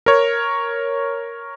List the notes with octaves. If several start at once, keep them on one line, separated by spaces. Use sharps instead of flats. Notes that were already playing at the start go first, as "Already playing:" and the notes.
A#4 C#5